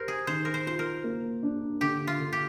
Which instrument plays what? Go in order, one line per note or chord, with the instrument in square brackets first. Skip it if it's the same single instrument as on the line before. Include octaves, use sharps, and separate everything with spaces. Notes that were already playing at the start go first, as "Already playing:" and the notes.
Already playing: [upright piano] G4 [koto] A#4 C5
[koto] G#4
[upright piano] D#3 [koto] C5
[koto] A#4
C5
[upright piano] F4 [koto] C5
[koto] A#4
[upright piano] A#3
D4
[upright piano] D3 [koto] G4
[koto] F4
[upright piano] D3
[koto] G4